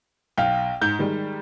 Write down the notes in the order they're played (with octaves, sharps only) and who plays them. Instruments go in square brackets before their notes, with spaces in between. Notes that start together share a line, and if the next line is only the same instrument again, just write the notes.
[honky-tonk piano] B1 [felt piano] F5 G5
[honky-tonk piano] G#2 [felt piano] G6
[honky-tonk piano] D#3 G3 G#3